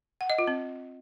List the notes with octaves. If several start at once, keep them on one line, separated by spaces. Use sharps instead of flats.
F#5
D#5
F4
C4